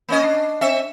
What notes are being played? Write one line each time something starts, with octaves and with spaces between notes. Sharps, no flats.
A#3 C#4 D#5
D4
C4 E5